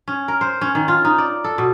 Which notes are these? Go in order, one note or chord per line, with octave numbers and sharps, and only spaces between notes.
C#4
A#4
C5
C#4
D#3
F4
D#4
D5
A4
B2